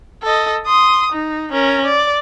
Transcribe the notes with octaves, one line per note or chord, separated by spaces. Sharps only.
A4 D#5
C6 D#6
D#4
C#4 A#4
D5